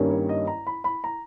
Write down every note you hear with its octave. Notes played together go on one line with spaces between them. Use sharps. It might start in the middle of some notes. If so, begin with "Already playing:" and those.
Already playing: G2 D#3 G3 A#3 C#4
C#5
D#5
A#5
B5
B5
A#5